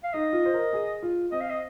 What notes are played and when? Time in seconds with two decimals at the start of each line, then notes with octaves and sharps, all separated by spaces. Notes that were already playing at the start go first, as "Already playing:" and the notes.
0.04 F5
0.13 D#4 D#5
0.33 F4
0.45 C5
0.54 A#4
0.73 G#4
1.03 F4
1.32 C4 D#5
1.41 F5
1.50 D#5